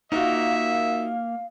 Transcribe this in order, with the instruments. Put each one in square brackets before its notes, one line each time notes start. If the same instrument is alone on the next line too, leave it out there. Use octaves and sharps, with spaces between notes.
[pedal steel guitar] A#3 A#4 [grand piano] D#4 F4 F#4 [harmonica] E5 [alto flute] F5